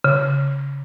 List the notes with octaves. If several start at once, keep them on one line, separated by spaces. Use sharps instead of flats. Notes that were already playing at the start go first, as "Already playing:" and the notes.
C#3